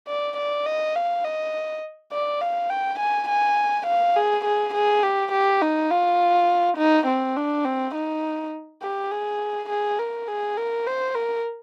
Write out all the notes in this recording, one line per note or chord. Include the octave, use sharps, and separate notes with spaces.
D5
D5
D#5
F5
D#5
D5
F5
G5
G#5
G#5
F5
G#4
G#4
G#4
G4
G4
D#4
F4
D#4
C4
D4
C4
D#4
G4
G#4
G#4
A#4
G#4
A#4
C5
A#4